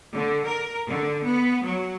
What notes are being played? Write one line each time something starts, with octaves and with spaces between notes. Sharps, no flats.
D3
A#4
D3
B3
F#3